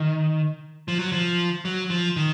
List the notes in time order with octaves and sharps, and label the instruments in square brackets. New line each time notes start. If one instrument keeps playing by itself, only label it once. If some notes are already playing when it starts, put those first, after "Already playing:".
Already playing: [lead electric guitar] D#3
F3
F#3
F3
F#3
F3
D#3